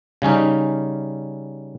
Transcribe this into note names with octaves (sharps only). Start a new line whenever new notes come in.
C#3 G3 C#4 D#4